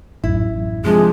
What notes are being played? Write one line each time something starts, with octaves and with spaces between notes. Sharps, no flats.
A1 F#2 E4
C3 F3 G#3 D4 G#4